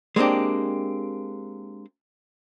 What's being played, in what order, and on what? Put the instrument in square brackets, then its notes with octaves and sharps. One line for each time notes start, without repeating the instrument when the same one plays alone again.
[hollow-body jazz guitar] G#3 A#3 C4 D4 G4